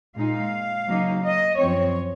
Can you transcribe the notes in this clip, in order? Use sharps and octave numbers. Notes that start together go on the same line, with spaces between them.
A#2 G#3 D#4 F5
C#3 F#3 A#3 D#4
D#5
F#2 F3 C4 C#5